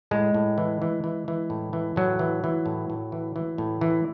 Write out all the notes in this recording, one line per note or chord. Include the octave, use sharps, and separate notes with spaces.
A2 G#3
A2
E3
E3
E3
E3
A2
E3
A2 F#3
E3
E3
A2
A2
E3
E3
A2
E3